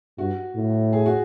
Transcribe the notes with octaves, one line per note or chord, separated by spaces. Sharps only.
G2 F#4
A2
G#4
F#4